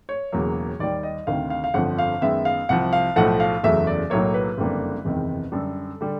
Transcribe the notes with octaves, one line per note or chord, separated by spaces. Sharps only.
C#5
E1 E2 C#3 F#3 A#3
D#2 D#3 G3 D5
D#5
D2 C3 D#3 F5
F5
F5
G1 F2 D3 F3 F#5
F5
F#2 D#3 G#3 B3 E5
F5
C2 C3 F3 F#5
F5
B1 A2 F3 A3 F#5
F5
F#1 E2 C#3 F#3 A3 E5
D5
B1 A2 F#3 A#3 C#5
B4
F#1 F2 D3 G3 A#3
F#1 E2 C3 D#3 G#3
F#2 D3 G3 A4
D3 G3